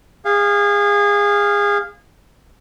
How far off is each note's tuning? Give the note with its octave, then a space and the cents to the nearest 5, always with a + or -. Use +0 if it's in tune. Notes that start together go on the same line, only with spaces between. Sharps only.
G#4 -25 F5 +0